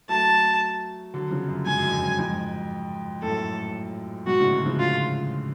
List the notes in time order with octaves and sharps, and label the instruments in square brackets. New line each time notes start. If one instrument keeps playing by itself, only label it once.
[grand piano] F#3 A3 [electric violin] A5
[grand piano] D3 F#3
C#3 F3
F#2
[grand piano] G#2 [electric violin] G#5
[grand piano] F#2
F2
F#2
F2 G#2
[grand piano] F#2 A2 [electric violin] A4
[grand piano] G#2 B2 [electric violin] F#4
[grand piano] A2 C#3
B2 D3
C#3 F3
[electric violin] F4